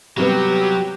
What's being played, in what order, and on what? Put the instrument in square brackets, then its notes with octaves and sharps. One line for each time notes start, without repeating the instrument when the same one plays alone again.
[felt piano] C3 G3 B3 [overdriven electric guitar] F#3 [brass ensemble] G4